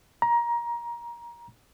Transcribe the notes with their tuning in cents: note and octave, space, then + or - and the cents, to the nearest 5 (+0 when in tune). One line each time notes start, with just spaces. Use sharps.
A#5 +20